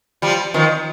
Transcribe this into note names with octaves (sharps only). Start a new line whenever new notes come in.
F3 G3
D#3 F3